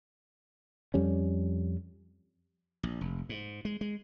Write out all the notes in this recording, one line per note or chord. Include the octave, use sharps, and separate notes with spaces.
F2 G3 C#4
A#1
F1
G#2
G#3
G#3